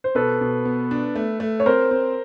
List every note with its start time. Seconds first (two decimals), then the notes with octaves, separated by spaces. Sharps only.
0.04 C5
0.15 B2 A4 B4
0.41 B2
0.65 B3
0.91 D4
1.16 A3
1.40 A3
1.60 C#5
1.66 C4 A#4 C5
1.91 C4